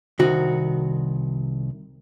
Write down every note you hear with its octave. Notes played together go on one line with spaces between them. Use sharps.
C2 D#3 F#4